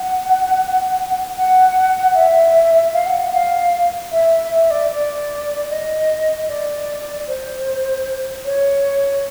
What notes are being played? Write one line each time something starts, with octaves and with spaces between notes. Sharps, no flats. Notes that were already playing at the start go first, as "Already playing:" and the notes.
Already playing: F#5
F#5
E5
F5
F#5
F#5
F5
E5
E5
D5
D5
D#5
D5
C5
C#5